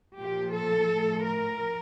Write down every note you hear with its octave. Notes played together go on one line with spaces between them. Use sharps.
A#2 F3 G4
A4
A2 F3
A#4